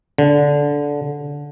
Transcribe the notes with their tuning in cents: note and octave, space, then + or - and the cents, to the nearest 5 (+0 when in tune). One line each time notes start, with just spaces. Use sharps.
D3 -15